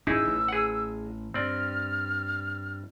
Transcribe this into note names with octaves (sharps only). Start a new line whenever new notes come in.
D#1 G#1 C#4 D#4 E4 G#4 E6
A1
G#4 F#5
G2 C4 D5 F6